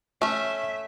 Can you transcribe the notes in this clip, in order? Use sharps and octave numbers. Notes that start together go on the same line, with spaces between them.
A3 C#4 E5